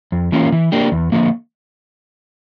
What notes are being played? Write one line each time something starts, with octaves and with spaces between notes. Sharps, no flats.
F2
E3 A#3 C#4 F4
E3
A#3 D4 G4
E2
D3 F3 A#3